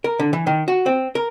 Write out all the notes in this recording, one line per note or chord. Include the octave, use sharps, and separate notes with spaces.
A#4
D3
E3
D#3
F#4
C4
A#4